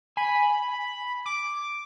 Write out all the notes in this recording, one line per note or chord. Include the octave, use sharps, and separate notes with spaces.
G#5 B5
D6